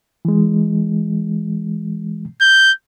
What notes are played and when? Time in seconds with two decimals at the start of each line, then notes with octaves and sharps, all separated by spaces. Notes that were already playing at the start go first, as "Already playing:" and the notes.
0.25 E3 G#3
2.41 G6